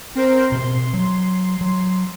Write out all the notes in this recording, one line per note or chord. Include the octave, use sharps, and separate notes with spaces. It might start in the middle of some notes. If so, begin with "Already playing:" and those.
C4 A#4 C5
B2 C4 C6
F#3
F#3